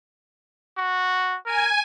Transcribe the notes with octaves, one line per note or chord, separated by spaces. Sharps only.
F#4
A#4 G#5